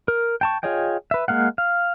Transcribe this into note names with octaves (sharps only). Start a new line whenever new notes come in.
A#4
G5 A5 C#6
F4 G#4 C#5 D#5 G5
B4 E5
G#3 A#3 F5 F#5
F5